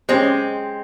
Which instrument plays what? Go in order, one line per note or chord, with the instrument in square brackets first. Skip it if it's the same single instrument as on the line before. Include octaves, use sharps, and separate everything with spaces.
[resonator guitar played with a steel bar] G#3 C4 [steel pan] C#4 G4 C5